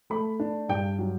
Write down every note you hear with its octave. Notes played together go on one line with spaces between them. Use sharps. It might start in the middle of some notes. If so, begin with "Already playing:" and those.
A3 B5
D4
G2 G5
F#3